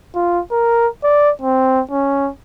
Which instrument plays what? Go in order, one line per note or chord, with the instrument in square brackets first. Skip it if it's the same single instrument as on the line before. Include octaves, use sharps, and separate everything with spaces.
[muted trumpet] F4
A#4
D5
C4
C#4